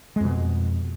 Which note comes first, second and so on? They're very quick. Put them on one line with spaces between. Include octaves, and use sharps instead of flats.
G#3 F2 B2